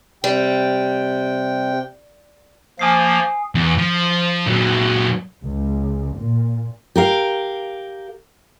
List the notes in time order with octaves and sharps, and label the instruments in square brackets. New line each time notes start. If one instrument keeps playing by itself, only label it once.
[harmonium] C3 G5 [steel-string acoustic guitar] G3
[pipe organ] F3 A#3 [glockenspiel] G#5 D#6 C7
[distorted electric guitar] E2
F3
A#2 F#3
[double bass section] C#2
A#2
[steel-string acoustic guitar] G4 A#4 F5